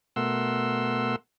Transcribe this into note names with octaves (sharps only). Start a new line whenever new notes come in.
B2 A3 A#4 F#5 C6 E6